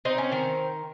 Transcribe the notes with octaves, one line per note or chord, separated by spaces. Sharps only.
C4 D#4
C#4
D#3 A#4